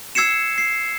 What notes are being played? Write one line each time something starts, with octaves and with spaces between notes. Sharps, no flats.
E6 G#6 C7 C#7 E7
C7